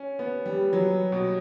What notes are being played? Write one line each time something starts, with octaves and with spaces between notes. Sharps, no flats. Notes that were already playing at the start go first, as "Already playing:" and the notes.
Already playing: C#4
B3
G3
F#3
B2